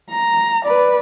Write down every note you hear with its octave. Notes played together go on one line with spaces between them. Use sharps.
A#5
B4 D5